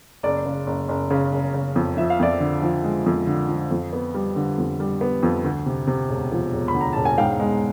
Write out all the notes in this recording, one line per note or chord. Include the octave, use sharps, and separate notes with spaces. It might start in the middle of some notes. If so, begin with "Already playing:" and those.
F#1 D5
C#3
F#1
F#1
C#3
F#1
C#3
F2
F3 E5
F5
F2 D5 E5
D3
F3
G#3
F2
D3
F3
F2
B3
G3
D3
F2
G3
B3
F2
D2
C3
C3
E1
F3
E1
B5
D2
A#5
E1 A5
G#5
G#2 F5 G5
G#3